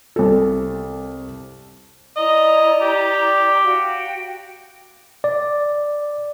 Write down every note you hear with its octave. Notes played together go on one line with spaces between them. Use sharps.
C2 A4
E4 D5 D#5 A#5
G4
F#4 F5 G5
D5